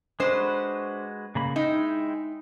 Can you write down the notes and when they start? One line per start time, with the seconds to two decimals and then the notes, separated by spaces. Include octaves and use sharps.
0.20 G#3 D4 F#4 B4 C5
1.35 C#3 A#3 B5
1.56 G#3 D#4 E4 G5